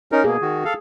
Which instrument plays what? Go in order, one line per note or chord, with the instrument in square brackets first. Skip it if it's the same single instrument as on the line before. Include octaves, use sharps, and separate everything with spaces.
[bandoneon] C#4 D#4 A#4
[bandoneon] B2 A#3 [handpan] G#4
[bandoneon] D#3 F#4
A4 F5